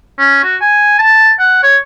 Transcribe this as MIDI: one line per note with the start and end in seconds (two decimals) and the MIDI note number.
0.19 0.39 61
0.44 0.56 66
0.61 0.94 80
0.99 1.31 81
1.40 1.62 78
1.63 1.77 73